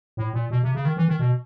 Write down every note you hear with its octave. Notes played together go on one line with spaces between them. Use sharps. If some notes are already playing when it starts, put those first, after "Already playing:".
A2
A#2
B2
C3
C#3
D#3
E3
D#3
B2